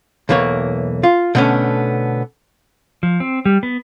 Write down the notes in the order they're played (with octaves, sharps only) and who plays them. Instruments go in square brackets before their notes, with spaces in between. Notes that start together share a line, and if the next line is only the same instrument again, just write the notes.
[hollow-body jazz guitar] B1 E2 E3 A#3 C#5
F4
B2 D3 A3 B3 C#4
[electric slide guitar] F3
C4
G3
B3